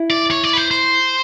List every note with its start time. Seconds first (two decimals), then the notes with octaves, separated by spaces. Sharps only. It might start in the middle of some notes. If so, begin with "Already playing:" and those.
Already playing: E4
0.11 D5
0.31 C#5
0.44 D5
0.53 B4
0.57 C5
0.71 C5